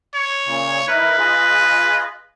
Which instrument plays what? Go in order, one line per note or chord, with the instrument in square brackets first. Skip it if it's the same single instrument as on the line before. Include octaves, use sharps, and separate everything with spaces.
[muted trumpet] C#5
[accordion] A#2 C#3
[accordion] D#4 E4 A#4 [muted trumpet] B4
[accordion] F4 G#4 D#5